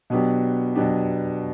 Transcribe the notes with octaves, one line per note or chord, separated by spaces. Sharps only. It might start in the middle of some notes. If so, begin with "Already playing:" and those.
B2 F#3 B3 D4 G4
B2 F#3 B3 D4 G4